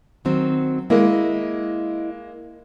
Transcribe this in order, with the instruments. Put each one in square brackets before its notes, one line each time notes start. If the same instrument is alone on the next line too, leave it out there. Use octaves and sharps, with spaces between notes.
[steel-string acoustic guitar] D#3 F#3 C4
[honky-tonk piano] G#3 A#3 [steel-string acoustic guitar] E4 D#5